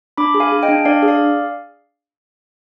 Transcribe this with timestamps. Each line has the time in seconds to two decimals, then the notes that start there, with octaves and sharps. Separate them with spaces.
0.17 D4 B5 D6
0.34 G#4
0.40 F5 G#5
0.52 G#4
0.63 D#5 G5
0.69 D4
0.85 D4 D5 F5
1.03 G#4
1.08 D5 F5